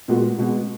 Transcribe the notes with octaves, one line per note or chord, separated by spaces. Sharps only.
A#2 G#3 B3 F#4
B2 G#3 B3